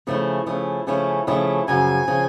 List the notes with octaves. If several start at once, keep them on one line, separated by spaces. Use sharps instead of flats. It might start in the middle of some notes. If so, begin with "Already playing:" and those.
C#3 F3 A3 C#4 E4
C#3 F3 A3 C#4 E4
C#3 F3 A3 C#4 E4
C#3 F3 A3 C#4 E4
F#2 C#3 F3 G#5
C#3 F3